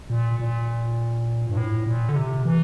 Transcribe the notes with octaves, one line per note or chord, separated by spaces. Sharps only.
A#2
A#2
G2
A2
A#2
D3
C3
E3